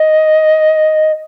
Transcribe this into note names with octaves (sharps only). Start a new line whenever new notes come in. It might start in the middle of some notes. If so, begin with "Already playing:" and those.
Already playing: D#5